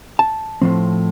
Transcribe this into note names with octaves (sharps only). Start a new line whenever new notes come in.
A5
A2 F3 C4